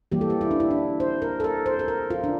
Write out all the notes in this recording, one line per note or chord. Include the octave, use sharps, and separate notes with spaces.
E3 G3 A#3 G4
A4
G4
E4
D4
E4
D4
C5
A#4
A4
A#4
C5
A4
A#4
F4
D4